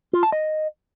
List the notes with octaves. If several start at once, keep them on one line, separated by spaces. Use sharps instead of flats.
F4
A5
D#5